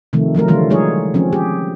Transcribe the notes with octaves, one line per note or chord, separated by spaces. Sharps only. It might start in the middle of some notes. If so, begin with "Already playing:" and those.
C3 D#3 F3 A3
F3 F#3 A3 A#4
D3 E3 F3 G3 A3 F4
F#3 G#3 D#4 G#4 C#5
F3 C4 C#4
G4 G#4